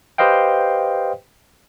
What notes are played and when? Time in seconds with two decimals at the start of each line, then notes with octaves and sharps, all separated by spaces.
0.18 G4 B4 C5 D#5 F5 G5